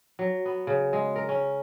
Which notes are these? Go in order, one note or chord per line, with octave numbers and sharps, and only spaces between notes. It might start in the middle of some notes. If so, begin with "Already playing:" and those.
F#3
B3
C#3
G#3
A#4
C#4